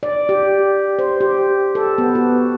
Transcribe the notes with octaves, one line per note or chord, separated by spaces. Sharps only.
D5
G4
C5
G4
A4
B3
F#4